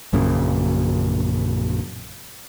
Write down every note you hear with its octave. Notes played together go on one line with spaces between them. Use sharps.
A#1 F#2 A#2 C#3